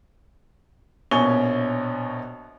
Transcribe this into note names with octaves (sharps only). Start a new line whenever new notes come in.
A#1 B2 C#4 G#5 C#6 G7